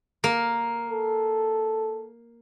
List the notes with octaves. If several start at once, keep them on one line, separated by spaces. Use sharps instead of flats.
A#3
A4